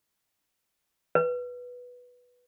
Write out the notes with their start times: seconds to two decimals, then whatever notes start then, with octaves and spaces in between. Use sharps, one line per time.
1.15 B4